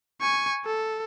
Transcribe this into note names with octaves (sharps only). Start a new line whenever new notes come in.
G#5 C#6
A4